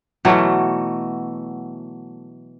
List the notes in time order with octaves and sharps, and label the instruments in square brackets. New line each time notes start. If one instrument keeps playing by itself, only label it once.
[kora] B2 E3 F#3 A3